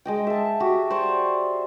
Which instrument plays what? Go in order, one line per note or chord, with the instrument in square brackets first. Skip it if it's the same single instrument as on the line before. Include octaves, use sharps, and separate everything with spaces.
[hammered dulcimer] G#3 D#5 G5
E5 A5
F#4 G4
C5 D5 C#6